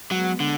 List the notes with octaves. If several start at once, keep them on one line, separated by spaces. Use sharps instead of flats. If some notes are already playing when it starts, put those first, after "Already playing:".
F#3 G#3 B3
D3